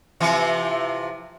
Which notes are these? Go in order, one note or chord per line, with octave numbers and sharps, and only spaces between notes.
C3 E3 F3